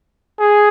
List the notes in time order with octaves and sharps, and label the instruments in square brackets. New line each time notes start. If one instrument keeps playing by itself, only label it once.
[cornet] G#4